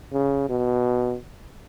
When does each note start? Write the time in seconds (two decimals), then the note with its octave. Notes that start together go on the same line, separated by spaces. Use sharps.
0.13 C#3
0.49 B2